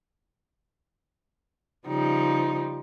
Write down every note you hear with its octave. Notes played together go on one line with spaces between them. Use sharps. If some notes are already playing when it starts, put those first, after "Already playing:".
C#3 F3 G3 D#4